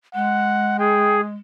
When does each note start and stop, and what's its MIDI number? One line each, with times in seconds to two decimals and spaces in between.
0.15 1.35 56
0.15 0.76 78
0.79 1.21 68
0.79 1.18 79